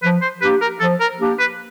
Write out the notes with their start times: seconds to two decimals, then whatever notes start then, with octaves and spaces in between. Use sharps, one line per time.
0.03 F3 B4
0.21 C5
0.41 A#3 D4 G4 B4
0.61 A#4
0.80 F3 A4
1.00 A#4
1.19 A#3 D4 G4
1.39 B4